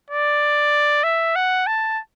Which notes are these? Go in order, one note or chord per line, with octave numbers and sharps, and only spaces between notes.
D5
E5
F#5
A5